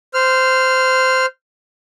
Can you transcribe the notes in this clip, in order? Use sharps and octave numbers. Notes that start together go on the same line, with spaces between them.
C5 F6